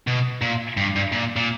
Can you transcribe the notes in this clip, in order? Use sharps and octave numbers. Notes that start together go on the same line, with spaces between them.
B2
A#2
G2
G2
A#2
A#2